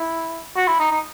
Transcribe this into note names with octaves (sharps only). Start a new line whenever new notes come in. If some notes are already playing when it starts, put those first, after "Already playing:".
Already playing: E4
F#4
E4
D#4
D#4